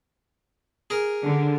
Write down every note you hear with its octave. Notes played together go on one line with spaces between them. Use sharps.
G#4 A#4
D3